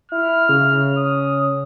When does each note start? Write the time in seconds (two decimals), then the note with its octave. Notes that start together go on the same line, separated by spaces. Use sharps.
0.12 E4 F6
0.49 C#3
0.98 D#6